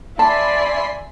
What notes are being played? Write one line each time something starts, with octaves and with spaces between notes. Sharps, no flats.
D5 E5 G#5 A5 B5 C6